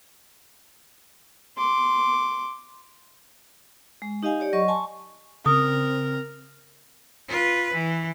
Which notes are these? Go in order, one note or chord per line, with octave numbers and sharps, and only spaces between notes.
C6 D6
G#3
D#4 G4 D#5 F5 G#5
G4 C#5 D5
F#3 D#5 C#6
G#5 A5 C6 C#6
C#3 C4 A#4 D#6
F4 B4
E3